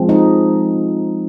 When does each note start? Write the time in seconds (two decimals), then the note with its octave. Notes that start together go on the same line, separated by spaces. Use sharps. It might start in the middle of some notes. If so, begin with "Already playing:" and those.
Already playing: F3 G#3 C4
0.09 D#4